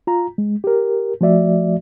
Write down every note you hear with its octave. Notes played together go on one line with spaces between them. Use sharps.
F4 A#5
G#3
G4 A#4
F3 A3 F#4 D5 E5